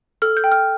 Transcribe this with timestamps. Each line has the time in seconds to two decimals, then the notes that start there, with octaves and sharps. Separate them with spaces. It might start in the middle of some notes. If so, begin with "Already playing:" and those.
0.22 A4 F6
0.37 G6
0.44 G5
0.52 F6